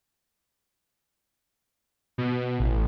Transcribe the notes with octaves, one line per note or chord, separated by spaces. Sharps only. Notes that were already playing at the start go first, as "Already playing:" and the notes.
B2
A1